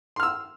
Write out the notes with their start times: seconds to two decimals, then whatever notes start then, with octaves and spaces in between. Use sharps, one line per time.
0.16 C6
0.20 F6
0.23 E6